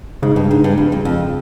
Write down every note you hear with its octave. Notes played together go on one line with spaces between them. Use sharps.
G#2 C#3
G2
G#2
G2
F2
F#2
F2